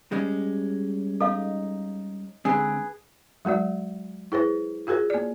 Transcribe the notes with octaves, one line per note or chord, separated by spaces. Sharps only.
G3 G#3 C#4
D#4 A4 F5
D3 G#3 C4 G#4 B4
F#3 G#3 F#4 D5
E4 G#4 B4 C5
F4 F#4 G#4 A#4 C5
A#3 D5